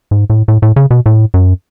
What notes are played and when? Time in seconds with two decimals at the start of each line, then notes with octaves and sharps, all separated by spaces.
0.11 G#2
0.30 A2
0.48 A2
0.62 A2
0.76 C#3
0.91 B2
1.06 A2
1.34 F#2